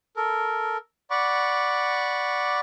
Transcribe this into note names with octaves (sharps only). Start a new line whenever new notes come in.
A4 A#4
D5 F#5 B5 C#6 D6